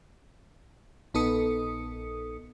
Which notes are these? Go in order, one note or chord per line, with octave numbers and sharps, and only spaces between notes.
A#1 B3 D#4 A4 D#6 C#7